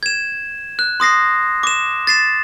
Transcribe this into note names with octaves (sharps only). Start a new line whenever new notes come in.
G#6 E7
F#6
C6 D#6 A#6 C7
D6 E7
A6 C7 E7